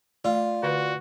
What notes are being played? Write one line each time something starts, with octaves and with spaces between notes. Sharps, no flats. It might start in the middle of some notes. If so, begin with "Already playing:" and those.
A3 F4 D5
D3 F#4 B4 F#5